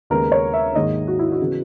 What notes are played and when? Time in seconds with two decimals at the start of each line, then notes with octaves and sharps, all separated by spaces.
0.10 D#2 C#3 G#3 B3 A#4
0.32 C#5
0.54 E5
0.75 G#2 D#3 A#3 D#5
1.07 F#4
1.19 E4
1.32 F#4
1.41 C#3 E3 B3